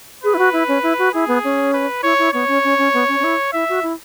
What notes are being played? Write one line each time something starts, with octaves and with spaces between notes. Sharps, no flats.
G#4 B4
E4
F#4
E4
C#4
E4
F#4
E4 G#4
B3
C#4
B4
E4 C#5
E4
B3 C#5
C#4
C#4
C#4
B3
C#4
C#4
E4
E4 E5
F#4
E4